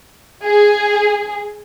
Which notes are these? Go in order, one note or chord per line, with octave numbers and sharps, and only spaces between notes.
G#4